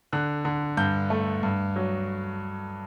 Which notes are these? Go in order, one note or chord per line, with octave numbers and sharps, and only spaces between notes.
D3 F#6
D3
G2 G6
A3
G2
F#3